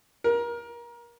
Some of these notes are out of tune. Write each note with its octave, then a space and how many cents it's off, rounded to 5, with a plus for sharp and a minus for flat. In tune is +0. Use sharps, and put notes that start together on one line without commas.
A#4 +25